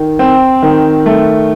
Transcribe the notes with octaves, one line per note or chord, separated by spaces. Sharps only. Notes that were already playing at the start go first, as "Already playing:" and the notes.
Already playing: D#3
C4
D#3
A3